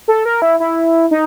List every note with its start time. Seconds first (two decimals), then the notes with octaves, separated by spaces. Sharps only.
0.08 A4
0.25 A#4
0.42 E4
0.60 E4
1.11 D#4